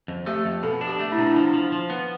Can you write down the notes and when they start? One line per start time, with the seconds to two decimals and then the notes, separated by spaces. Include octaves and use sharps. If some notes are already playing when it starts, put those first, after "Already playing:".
0.08 F2
0.26 A3 G4
0.45 F2
0.63 B2 A4
0.81 D4
0.87 G4
0.99 A3
1.12 E4
1.17 B2 D4
1.27 E4
1.36 F3 D4
1.53 F3
1.72 F3
1.90 B3